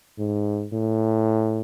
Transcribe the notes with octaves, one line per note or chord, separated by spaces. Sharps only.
G#2
A2